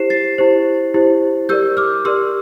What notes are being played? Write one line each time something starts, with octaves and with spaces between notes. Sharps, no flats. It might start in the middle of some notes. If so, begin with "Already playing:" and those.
Already playing: E4 G4 C5 C7 E7
A6 C7
E4 G4 C5
E4 G4 C5
G4 A#4 D5 E6 G6
D6 F6
G4 A#4 D5 C6 E6